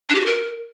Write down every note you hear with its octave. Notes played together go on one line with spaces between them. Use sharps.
D4
G4
F#4
A#4